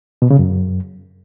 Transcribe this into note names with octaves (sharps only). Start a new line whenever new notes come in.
B2
C#3
F#2